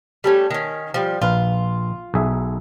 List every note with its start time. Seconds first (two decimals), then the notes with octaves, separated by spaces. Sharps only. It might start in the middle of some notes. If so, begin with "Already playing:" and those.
0.24 G3 A3 C#4
0.51 D#3 C#4
0.94 F3 G3
1.22 A#1 F4 B4
2.14 B1 G#4 E5